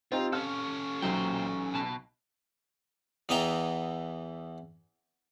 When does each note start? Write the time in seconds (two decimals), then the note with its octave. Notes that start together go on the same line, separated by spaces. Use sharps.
0.12 C4 D#4 F4 G4
0.32 C#4 A4 F5 F6
1.02 B1 A#2 F#3 C5 G5
1.74 B2 A5
3.29 E2 E3 B3 D#5 G5 A#5